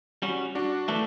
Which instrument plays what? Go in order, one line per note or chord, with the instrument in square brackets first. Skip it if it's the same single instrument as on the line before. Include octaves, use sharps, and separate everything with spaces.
[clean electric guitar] G3 C#4 F#4
[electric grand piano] D4 F#4
[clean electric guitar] E3 A3 E4 A4